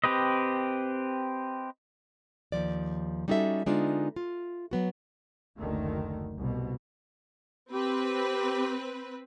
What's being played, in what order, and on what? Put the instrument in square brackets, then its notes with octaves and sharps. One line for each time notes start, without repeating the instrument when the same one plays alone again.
[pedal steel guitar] C4 G4 B4 D#5
[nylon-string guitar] D#2 G#2 F3 D5
G3 C#4 D#4 F#4 A4 E5
D3 G#3 B3 D4 D#4 F4
F4
F#3 B3 F#4
[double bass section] F#1 D2 D3 D#3 A3
C2 B2
[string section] C4 B4 [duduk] G4